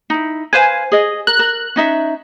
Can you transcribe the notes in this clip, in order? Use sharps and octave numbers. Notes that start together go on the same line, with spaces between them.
D#4 E4
B4 C5 F5 G#5
G#4 D#5
A#4 F#6
A#4
C#4 D#4 E5